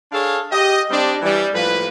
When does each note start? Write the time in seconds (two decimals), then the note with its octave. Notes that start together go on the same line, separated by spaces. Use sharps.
0.12 D4 G#4 A4 C#5 F5
0.51 G4 D#5
0.90 G3 C4 D4
1.22 E3 G3
1.54 A2 F3 A#3 B4